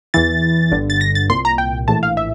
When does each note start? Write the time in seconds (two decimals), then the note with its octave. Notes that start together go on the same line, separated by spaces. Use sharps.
0.14 E2 E3 A6
0.71 G1 G2 D3
0.90 A6
1.01 A#6
1.15 A6
1.29 C2 A#2 C6
1.45 A#5
1.58 G5
1.88 A#1 A2 E3 A5
2.03 F5
2.17 E5